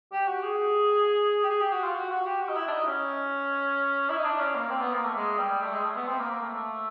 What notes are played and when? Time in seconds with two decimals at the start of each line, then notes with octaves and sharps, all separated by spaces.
0.12 G4
0.27 F#4
0.43 G#4
1.43 G4
1.49 G#4
1.60 G4
1.72 F#4
1.84 F4
1.95 F#4
2.11 F#4
2.26 G4
2.41 F#4
2.49 D#4
2.56 E4
2.67 D4
2.71 D#4
2.87 C#4
4.09 E4
4.17 D#4
4.24 D4
4.39 C#4
4.55 A#3
4.70 C4
4.81 B3
4.92 A#3
5.05 A3
5.16 G#3
5.38 G3
5.61 A3
5.73 G#3
5.84 A3
5.96 B3
6.07 C4
6.19 A#3
6.30 A#3
6.42 A3
6.53 A3